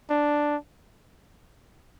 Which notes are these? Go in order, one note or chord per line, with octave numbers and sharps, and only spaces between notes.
D4